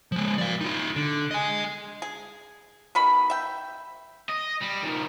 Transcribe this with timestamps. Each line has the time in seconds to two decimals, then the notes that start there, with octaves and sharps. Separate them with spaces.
0.12 F3 G#3
0.38 D5 F5
0.61 D#4 F4
0.96 D3
1.31 D#5 G#5
2.02 G#4
2.95 B2 D#3 B5
3.30 E5 G5
4.29 D#5
4.61 G3
4.83 D#3 F3